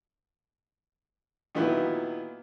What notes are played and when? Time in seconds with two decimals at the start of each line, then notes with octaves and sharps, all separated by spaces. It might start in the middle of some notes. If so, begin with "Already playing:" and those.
1.55 A#2 D#3 F#3 B3 E4